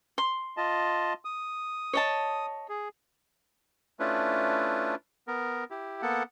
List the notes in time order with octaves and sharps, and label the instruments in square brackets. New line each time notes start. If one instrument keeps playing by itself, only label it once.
[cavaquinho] C6
[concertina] F4 D#5 A5
D#6
[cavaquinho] C#5 D#5 A5
[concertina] G#4
A3 C#4 D4 E4 F4 B4
B3 A#4
E4 G4
A#3 B3 A4 F#5